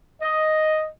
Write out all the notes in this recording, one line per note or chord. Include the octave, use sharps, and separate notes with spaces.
D#5